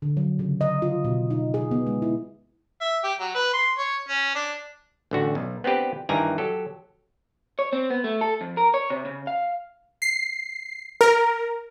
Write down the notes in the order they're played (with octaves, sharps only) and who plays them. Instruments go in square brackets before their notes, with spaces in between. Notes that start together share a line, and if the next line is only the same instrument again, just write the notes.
[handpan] D3
F#3
C#3
D#5
F4
B2
D#4
G#4
B3
G#3
E4
[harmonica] E5
G4
F#3
B4
C6
C#5
C#4
D4
[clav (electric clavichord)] A1 D3 F#4
B1
B3 C4 D4 G4 B4
G2 D#3 E3 D5 G#5 A#5
F#3 G4 A4
[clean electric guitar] C#5
C4
B3
A3
A4
F2
A#4
C#5
C3
C#3
F5
[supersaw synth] C7
A#4